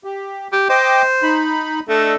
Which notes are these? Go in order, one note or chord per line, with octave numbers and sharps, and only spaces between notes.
G4
G4
C5 D#5 G5 D6
D#4 B5
A3 D4 A4 D#5